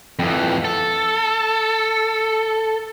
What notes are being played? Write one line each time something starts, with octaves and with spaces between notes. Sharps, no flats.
F2 E3
A4